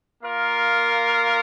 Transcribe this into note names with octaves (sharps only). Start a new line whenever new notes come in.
A#3 F4 A#4 F5